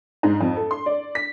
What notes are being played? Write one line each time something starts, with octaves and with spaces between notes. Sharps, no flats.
G#2
F2
A4
C6
D5
B6